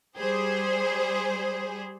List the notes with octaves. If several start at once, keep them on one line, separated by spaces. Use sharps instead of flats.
G3 G#4 C5